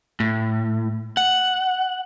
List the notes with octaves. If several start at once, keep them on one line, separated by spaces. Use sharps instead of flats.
A2
F#5